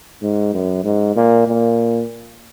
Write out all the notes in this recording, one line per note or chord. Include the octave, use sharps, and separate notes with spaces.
G#2
F#2
G#2
A#2
A#2